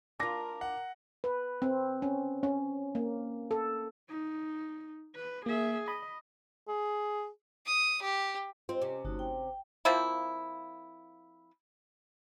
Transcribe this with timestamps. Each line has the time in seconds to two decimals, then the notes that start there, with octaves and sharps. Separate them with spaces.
0.20 D4 F4 A#4 D6 A#6
0.61 F#5
1.24 B4
1.62 C4
2.02 C#4
2.43 C#4
2.95 A#3
3.51 A4
4.09 D#4
5.15 B4
5.46 A#3 G#4 E5
5.88 D#5 B5
6.68 G#4
7.66 D#6
8.02 G4
8.69 C4 F4 G4 D#5
8.82 C3 C#4
9.05 G1 A3 D#4 F#4
9.19 G5
9.85 F3 A#3 C4 E4